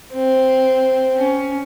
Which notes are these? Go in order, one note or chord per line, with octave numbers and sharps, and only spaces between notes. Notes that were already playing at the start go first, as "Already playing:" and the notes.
C4
C#4